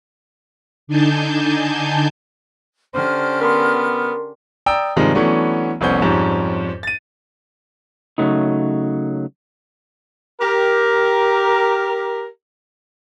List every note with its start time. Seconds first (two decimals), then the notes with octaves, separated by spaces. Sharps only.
0.87 D3 D4 D#4 G#5 A5 G6
2.94 D3 C#4 G4 C5 F6
3.41 B3 A#4 C6
4.66 D5 G5 A#5 D#6 E6
4.96 G2 C3 D#3 F3 G#3
5.15 E3 F#3 A3 B3 C#4 D4
5.81 F1 C2 B3 C#4 C5 G6
6.01 F2 G#2 G3 C#4
6.83 A6 D#7
8.18 C#3 F#3 A3 D#4
10.40 G4 A#4